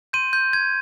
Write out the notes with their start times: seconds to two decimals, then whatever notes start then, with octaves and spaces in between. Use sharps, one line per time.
0.13 C6 G6 D#7
0.33 G6
0.53 G#6